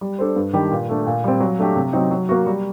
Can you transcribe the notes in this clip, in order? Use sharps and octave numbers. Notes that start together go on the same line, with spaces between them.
G3
D4 A4 C5
G2
D#3 G3 D4 G4
A#2
A3 D4
A#2
G3 C4
F#3
A3 D4 G4
C3
F#3 C4 D#4
F#3
A#3 F#4
G3